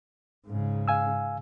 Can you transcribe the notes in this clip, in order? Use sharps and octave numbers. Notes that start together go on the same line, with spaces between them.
G#2 C#3
F5 G#5 E6